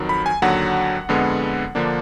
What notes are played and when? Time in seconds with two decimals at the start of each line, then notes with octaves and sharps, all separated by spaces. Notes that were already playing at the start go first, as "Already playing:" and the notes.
Already playing: F2 D#3 F#3
0.09 B5
0.26 G#5
0.42 D#2 D3 F#3 F#5
1.09 F2 D3 G#3 B3
1.75 D3 F3 A#3 D4